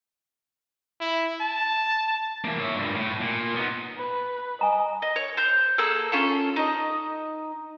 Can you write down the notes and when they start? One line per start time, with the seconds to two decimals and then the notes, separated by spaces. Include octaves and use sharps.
1.01 E4
1.41 A5
2.45 E3 A#3
2.60 C#5 E5
2.75 G2 A#2
2.95 A2
3.21 A#2
3.55 B3 D#4
3.97 B4
4.61 D#5 G#5 A#5
5.02 D#5
5.16 C#5
5.37 C5 G6
5.78 A#3 G#4 A4 E6
6.12 C#4 F4 A4
6.56 D#4 D#5